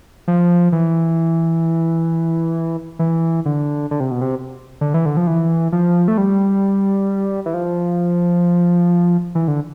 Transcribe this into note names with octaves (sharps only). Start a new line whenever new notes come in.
F3
E3
E3
D3
D3
C3
B2
C3
D3
E3
D3
F3
E3
F3
A3
G3
E3
F3
E3
D3